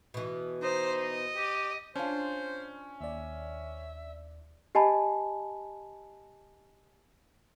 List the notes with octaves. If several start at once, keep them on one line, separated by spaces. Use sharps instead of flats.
B2 E3
D#4 C5
D#5
G4
C#4 D4 F4 C5
D#2 D5 E5
G4 D#5 G#5 A5 B5